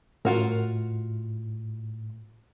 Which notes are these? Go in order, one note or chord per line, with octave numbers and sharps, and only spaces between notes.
A2 F4 F#4 A#4